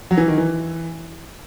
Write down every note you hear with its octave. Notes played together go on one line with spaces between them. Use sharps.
F#3
E3
D#3
E3